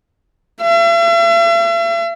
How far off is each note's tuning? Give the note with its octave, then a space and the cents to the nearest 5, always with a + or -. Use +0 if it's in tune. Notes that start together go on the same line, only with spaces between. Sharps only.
E5 +45